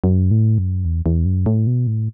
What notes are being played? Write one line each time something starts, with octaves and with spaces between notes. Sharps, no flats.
F#2
A2
F#2
E2
E2
F#2
A2
B2
A2